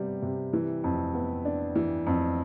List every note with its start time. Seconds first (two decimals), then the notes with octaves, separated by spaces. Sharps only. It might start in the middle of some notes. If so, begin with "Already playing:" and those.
Already playing: C3 G3 B3
0.22 C3
0.53 E3
0.84 F2
1.14 B3
1.45 D4
1.75 E3
2.07 F2